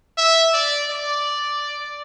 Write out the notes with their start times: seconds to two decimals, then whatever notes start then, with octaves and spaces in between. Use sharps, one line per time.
0.18 E5
0.53 D5
0.89 D5